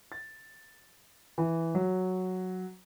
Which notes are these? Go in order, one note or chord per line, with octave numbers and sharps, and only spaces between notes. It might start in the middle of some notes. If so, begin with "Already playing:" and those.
A6
E3
F#3